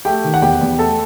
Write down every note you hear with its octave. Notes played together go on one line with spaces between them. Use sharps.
A3 G4 G5
D#3
F#5
E2 G4 G5
E2
A3 A4 A5